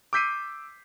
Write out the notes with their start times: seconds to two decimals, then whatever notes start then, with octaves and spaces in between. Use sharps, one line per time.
0.13 D6 E6 G6 B6 C7 D#7